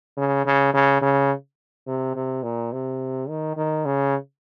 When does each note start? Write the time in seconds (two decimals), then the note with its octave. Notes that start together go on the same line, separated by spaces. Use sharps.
0.17 C#3
0.46 C#3
0.73 C#3
1.02 C#3
1.87 C3
2.15 C3
2.43 A#2
2.72 C3
3.29 D#3
3.56 D#3
3.85 C#3